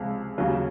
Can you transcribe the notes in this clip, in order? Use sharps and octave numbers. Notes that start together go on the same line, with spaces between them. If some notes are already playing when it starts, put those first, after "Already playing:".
Already playing: C#2 C3 F3 G#3
D#2 C#3 F#3